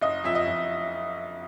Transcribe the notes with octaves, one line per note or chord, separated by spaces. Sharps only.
F#1 D#5
F2 E5
D#5
F2